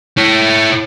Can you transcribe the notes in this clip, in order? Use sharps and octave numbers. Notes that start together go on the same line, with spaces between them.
E4 C#5